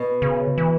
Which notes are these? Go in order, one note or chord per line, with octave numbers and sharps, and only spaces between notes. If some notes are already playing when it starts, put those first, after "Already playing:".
Already playing: B2
C#3
E3